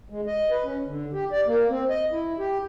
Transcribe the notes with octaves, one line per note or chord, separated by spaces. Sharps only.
G#3
D#5
B4
C#4
D3
G4
D5
A#3
C4
D#5
E4
G4